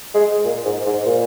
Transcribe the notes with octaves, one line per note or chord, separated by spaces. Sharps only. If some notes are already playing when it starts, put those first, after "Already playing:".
G#3
A#2
G#2
G#2
A#2